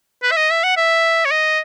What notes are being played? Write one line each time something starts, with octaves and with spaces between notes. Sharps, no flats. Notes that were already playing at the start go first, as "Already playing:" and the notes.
B4
E5
D#5
E5
F#5
E5
C#5
D#5